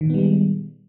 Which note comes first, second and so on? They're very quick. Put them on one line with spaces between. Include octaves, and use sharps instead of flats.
D#3 A#2 B3 G3 G#3